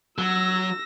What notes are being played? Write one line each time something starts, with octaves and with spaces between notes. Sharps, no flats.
F#3 E6 A#6